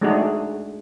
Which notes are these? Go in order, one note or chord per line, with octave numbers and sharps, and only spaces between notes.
G#3 A3 D4 D#4 F#4 G#4